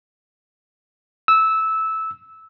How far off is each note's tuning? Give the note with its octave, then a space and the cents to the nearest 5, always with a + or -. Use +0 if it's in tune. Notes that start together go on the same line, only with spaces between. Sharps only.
E6 -15